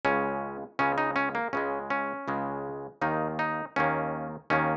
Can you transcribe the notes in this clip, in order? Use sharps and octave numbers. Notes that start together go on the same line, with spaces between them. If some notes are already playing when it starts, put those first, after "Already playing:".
C#2 C#3 G#3 C#4
C#2 C#3 G#3 C#4
D#4
C#4
A#3
C#2 C#3 G#3 C#4
C#4
C#2 C#3 G#3
D#2 D#3 A#3 D#4
D#4
D#2 D#3 A#3 C#4
D#2 D#3 A#3 C#4